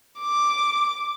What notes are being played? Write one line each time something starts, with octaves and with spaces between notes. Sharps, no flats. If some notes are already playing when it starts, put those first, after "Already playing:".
D6